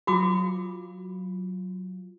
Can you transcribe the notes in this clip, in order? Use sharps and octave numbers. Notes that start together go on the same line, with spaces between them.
F#3 F4 F#4 B5 D6